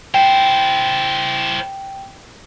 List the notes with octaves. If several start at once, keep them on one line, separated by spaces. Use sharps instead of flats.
E4 C5 G5